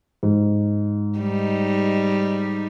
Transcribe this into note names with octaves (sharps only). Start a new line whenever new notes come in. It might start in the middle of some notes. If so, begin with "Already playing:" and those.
G#2
G3 D#4